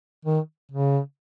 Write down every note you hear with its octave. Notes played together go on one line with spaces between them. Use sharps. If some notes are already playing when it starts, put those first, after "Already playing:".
D#3
C#3